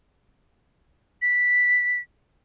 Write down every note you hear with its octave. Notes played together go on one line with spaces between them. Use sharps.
B6